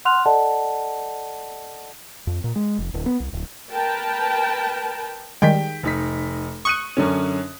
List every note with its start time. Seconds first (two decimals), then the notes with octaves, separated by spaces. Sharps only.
0.05 F#5 C6 F6 F#6 F7
0.26 A4 D5 D#5 F#5 A5
2.27 F2
2.44 A#2
2.56 G#3
2.78 F1
2.94 D1
3.06 B3
3.20 C2
3.33 D1
3.71 A#4 B4 G5 A5
5.42 D#3 G3 G#3 G5 B6
5.83 F1 D#4 B6
6.65 C#6 D#6 F#6 D#7
6.97 F#2 D3 C#4